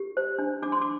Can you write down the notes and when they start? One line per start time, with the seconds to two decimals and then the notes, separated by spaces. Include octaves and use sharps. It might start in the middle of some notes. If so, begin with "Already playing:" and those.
Already playing: G4
0.17 C5
0.39 D4
0.62 D4 D6
0.72 C6
0.82 D6